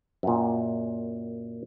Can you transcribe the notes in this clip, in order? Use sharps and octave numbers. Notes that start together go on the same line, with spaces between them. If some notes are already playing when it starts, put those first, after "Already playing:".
F#2 A#2